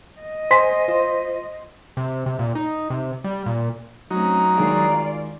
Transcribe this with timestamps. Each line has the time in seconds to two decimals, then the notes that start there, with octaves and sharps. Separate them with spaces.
0.20 D#5
0.51 C5 G#5 C6 B6
0.88 F4 C5
1.97 C3
2.26 C3
2.39 A#2
2.55 D#4
2.90 C3
3.24 G3
3.46 A#2
4.11 F#3 A3 C4 C#4 D#4 A#5
4.56 D#3 G#3 F4 F#4 D5 F5